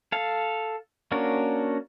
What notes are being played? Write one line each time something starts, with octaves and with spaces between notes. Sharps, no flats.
A4 F5
A#3 C#4 D4 F#4 A#4